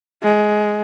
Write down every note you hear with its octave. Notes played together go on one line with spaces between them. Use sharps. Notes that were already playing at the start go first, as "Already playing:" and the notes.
G#3